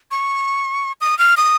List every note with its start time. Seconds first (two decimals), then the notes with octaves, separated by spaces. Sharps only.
0.11 C#6
1.01 D#6
1.19 F6
1.37 D#6